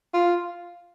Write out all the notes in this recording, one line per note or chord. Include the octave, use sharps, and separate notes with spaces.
F4